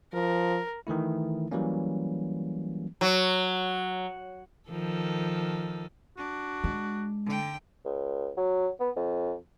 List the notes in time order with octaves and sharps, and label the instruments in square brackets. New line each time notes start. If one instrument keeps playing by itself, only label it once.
[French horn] F3 [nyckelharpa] A#4
[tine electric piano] D#3 E3 A3 E4
E3 F#3 G3 A#3 C#4
[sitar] F#3
[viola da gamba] D#3 F3 A4
[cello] D4 [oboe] F#4
[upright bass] G#3
[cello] D3 G5
[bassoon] C#2
F#3
B3
F2